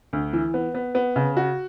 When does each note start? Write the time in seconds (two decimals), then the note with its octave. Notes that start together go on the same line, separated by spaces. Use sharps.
0.13 D2
0.33 E3
0.54 B3
0.75 B3
0.95 B3
1.16 C#3
1.37 F#4